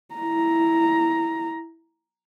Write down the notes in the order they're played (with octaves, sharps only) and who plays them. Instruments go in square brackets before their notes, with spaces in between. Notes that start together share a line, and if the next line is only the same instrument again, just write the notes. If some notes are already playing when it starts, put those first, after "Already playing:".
[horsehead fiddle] E4 A#5